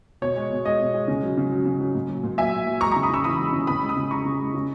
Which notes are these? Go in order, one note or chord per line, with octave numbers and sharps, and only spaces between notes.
B2 C#5
G#3
B2
G#3 D#5
B2
G#3
C#3
F#3
C#3
F#3
C#3
F#3
A#2
F#3
A#2
F#3 E5 G#5
A#2
F#3
G#3 A#5 C#6
A#5 C#6
C#3
B5 D#6
C#3 C#6 E6
E3 B5 D#6
G#3
C#3
C#3 B5 D#6
G#3
B5 D#6
C#3
G#3 A#5 C#6
C#3
G#3
C#3